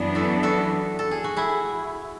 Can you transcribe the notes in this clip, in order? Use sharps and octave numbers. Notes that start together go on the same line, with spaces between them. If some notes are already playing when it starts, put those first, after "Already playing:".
Already playing: F#2 E3 B3 D4
F#4 A4
F#4 A4
A4
G#4
F#4
E4 G#4